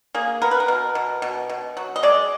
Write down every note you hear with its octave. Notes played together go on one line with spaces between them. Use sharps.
A#3 G#4
B3 A#4
B4
A#4
B2
B2
B2
B2
F#3
D#5
G#3 D5